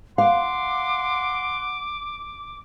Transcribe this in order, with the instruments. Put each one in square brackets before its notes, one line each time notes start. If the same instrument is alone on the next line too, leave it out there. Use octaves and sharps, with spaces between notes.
[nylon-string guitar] F5 [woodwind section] F#5 C6 [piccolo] D6